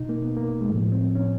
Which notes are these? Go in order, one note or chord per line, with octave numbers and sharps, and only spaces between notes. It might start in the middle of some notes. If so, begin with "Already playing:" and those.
Already playing: B2 D#4
A#3
B3
A#3
G#3
A2 F3 A3
C4
C#4